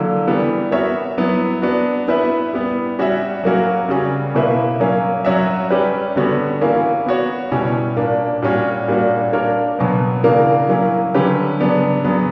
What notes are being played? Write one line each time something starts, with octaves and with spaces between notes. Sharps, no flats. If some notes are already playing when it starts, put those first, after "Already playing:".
Already playing: D3 F#3 A#3 E4
E3 G3 B3
B3 F#4 A#4 C#5 E5
F#3 B3 E4
B3 D4 F#4
B3 E4 B4 E5
G3 B3 E4
G3 C#4 F#4 C#5 E5
F#3 A#3 C#4 F#4 A#4
C#3 G3 C#4 F#4
B2 A#3 E4 B4 E5
F#3 A#3 C#4
F#3 C#4 F#4 C#5 E5
G3 C#4 G4 B4
D3 G3 B3 F#4 C#5
E3 A#3 C#4 E4
B3 F#4 C#5
B2 G3 C#4 E4
A#2 A#3 D4
A#2 G3 C#4 F#4
A#2 G3 A#3 D4 F#4
A#3 D4 A#4 C#5
B2 F#3 B3
C#3 E3 A#3 D4 A#4
F#3 A#3 C#4 E4
D3 F#3 C#4 G4 B4
C#3 F#3 B3 D4
C#3 F#3 B3 F#4